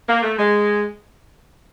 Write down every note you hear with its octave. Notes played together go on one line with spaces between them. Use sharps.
A#3
A3
G#3